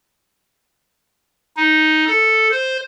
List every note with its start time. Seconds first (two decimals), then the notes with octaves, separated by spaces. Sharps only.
1.57 D#4
2.06 A4
2.51 C5